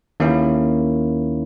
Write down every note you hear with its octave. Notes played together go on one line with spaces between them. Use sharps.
D#2 D#3 A#3 C#4 E4